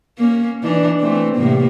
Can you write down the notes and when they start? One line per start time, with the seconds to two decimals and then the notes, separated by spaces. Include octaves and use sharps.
0.18 A#3 C#4
0.63 E3 D4 D#4
1.00 E3 A3 C4
1.35 A2 C3 A#3